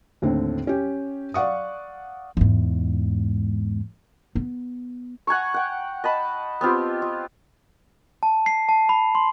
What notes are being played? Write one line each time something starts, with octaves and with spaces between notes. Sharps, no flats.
D#2 A2 D3 C4
C#4 G4
D5 F5 F#5 C#6 D#6
E2 G#2
B3
F#5 G#5 A#5 C#6
F#5 G5
D#5 A5 B5
B3 C4 F4 G4
F4
A5
C7
A5
B5
C6